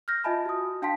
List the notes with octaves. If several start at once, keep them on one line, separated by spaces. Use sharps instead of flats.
F6 G6 A#6
F4 D#5 E5 G#5 A5 B5
F#4 D#6
D4 F5 G5 A5 C6 B6